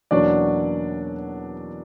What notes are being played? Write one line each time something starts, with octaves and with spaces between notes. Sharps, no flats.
E2 B2 F#3 A#3 C#4 D4 D5